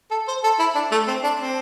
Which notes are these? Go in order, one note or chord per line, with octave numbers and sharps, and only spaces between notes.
A4
C5
A4
E4
D4
A3
C4
D4
C4